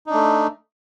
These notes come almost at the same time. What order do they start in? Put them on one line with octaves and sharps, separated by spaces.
D#4 D4 A3